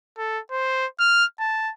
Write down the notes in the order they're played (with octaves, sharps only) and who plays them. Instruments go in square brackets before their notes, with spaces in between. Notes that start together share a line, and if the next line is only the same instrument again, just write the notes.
[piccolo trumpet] A4
C5
F6
A5